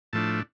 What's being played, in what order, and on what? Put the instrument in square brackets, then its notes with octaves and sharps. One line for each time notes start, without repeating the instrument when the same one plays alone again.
[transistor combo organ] A2 F3 A3 D4 A5